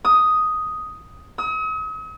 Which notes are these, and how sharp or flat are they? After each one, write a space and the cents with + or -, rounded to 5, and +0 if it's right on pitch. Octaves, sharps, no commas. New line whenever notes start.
D#6 +5
D#6 +45